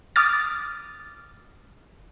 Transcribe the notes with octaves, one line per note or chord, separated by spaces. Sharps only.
D6 D#6 F6 A6